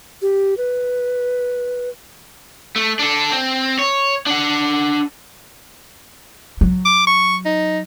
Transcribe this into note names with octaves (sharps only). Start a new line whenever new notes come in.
G4
B4
A3
D4 A4
C4
C#5
D4 F#5
F#3
D6
C#6
D#4